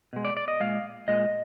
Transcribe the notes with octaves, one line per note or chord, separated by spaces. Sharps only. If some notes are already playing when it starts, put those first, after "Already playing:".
B2 G#3
D5
D5
D#5
A#2 G#3 F5
A#2 G#3 D#5